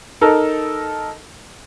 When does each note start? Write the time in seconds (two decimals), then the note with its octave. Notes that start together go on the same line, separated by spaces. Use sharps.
0.21 D#4 A4 A#4